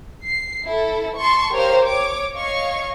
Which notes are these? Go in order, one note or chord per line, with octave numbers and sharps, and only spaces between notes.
C7
E4 A4
A5 C6 C#6
G4 A#4 C5 C#5 F5 F6
C#5 D6
C#5 D#5 F5 C#6